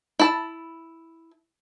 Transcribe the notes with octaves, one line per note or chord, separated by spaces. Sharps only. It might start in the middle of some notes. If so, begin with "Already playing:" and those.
E4 A5